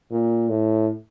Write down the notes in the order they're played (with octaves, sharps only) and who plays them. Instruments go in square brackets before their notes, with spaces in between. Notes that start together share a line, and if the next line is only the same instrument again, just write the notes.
[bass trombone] A#2
A2